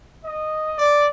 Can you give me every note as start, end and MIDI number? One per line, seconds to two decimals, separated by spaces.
0.25 0.74 75
0.78 1.08 74